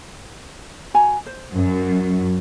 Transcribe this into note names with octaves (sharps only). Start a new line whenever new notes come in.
F#4 G#5 A#5
C5
F#2